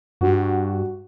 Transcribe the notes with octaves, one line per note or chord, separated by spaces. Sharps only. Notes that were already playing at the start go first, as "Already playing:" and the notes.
G2 F#4